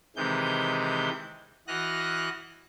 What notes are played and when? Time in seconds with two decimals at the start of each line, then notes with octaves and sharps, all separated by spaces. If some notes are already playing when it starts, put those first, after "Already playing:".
0.16 C3 D#3 E3 G#3 G6
1.68 E3 F#4 D#5 F6 F#6 A#6